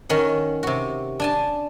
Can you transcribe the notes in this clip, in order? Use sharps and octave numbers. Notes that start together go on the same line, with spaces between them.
D#3 C#4 F#5
C3 F#4
D4 G#5 A5